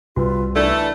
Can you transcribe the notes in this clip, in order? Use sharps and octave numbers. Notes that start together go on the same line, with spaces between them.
C2 C3 G3 F4 F#4 B4
E3 A3 D4 A#4 D5 A5